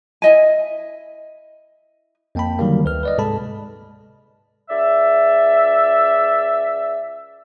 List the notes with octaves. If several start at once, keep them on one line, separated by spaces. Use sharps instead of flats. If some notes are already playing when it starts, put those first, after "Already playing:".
E4 D#5 G#5
F2 A#3 G5 A5 B5
D3 D#3 F#3 G3 A#3
D2 B4 F6
B4 D5 D#5
G#2 C3 G#3 A4 A5 B5
C#2 D5 E5